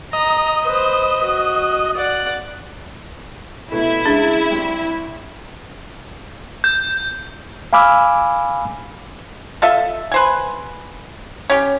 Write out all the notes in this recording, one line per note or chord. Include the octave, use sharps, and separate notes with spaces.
D#5 A#5
B4 C5
F#4
D5 F#5
B2 A3 B3 E4
C#3 G#3 D4
C2
G6
F5 G#5 B5 D6 E6 F6
F4 A4 D#5 E5
B4 C5 G#5
C#4 G4